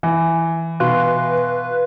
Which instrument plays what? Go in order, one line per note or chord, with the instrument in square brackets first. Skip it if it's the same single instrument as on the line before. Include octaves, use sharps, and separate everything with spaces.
[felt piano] E3
[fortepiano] B2 [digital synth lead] B4 [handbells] F5 C6